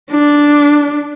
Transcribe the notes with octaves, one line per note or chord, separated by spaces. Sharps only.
D4